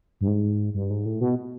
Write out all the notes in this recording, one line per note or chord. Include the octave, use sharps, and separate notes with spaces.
G2
G#2
G2
G#2
A2
B2